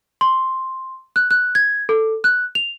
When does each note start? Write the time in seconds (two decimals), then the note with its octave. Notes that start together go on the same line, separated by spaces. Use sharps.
0.21 C6
1.16 F#6
1.31 F#6
1.55 G#6
1.89 A4
2.24 F#6
2.55 F7